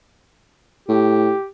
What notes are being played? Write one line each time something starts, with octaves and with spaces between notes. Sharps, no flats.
A2 G4